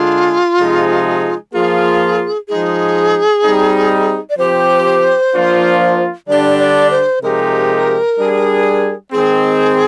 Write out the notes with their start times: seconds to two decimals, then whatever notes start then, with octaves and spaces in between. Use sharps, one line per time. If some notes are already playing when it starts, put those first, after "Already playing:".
Already playing: D3 G#3 D4 F4 G#4
0.58 C3 F3 G#3 D#4 G#4
1.53 F3 A#3 F4 G#4
2.48 F3 G#3 D#4 G#4
3.43 G3 C4 D#4
4.30 D5
4.37 F3 C4 G4 C5
5.33 F3 A#3 D4 F4
6.28 D3 G3 D4 G4 D5
6.59 D5
6.91 C5
7.22 C3 F3 G#3 D#4 G4 A#4
8.18 G3 D4 G#4
9.12 D#3 G#3 C4 G#4